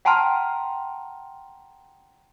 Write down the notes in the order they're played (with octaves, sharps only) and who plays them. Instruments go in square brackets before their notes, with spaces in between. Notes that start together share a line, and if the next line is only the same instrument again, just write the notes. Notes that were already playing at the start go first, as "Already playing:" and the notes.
[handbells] F#5 G5 A5 A#5 C6 F6